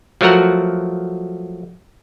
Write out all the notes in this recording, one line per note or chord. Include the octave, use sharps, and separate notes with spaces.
F3 F#3 A3 F#4 A#4 F#5